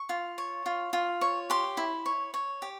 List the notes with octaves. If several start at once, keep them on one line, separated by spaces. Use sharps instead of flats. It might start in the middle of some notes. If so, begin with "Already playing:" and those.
Already playing: C#6
F4
C#5
F4
F4
C#5
G4 C6
E4
C#5
C#5
G4